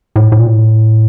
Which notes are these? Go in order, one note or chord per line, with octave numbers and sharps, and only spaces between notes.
A2
A2
A#2
A2